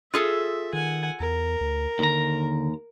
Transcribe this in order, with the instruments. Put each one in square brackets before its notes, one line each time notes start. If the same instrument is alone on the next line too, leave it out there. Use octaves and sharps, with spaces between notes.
[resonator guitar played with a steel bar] F4 G#4 A4 [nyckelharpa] E5
[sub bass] D#3 [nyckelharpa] F#5 G#5
[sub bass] E2 [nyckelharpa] A#4
[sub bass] D2
[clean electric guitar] D#2 A#5 [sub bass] D3